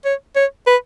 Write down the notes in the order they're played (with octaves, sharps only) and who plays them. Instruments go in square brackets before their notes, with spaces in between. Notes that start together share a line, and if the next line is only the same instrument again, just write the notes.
[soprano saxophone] C#5
C#5
B4